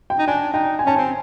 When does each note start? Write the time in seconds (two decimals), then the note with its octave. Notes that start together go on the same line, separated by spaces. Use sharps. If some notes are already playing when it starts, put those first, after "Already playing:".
0.10 G5
0.19 D#4
0.27 D4 G#5
0.53 D#4 G5
0.79 G#5
0.86 C#4 A5
0.95 C4 G#5